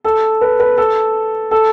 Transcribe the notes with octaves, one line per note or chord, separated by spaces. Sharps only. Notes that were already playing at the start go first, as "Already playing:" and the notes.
A4
B4
B4
A4
A4